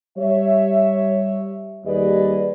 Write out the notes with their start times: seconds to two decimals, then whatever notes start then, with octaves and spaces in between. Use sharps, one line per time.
0.17 G3 C#5 E5
1.85 D#2 G3 G#4 B4 D5 D#5